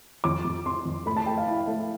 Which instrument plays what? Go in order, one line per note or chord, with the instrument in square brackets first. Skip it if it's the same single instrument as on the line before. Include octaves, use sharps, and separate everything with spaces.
[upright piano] F2 D6
F2
C4 C6
F2
A3 B5
A5
A3 G5
F5
E4
A3